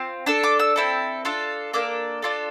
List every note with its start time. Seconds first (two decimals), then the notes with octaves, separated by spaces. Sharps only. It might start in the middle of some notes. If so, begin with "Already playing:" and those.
Already playing: C4 F4
0.26 D4 A4 E6
0.44 D6
0.59 E6
0.76 C4 E4 A4
1.25 D4 F4 A4
1.73 A#3 D4 A4 D6
2.22 D4 F4 A4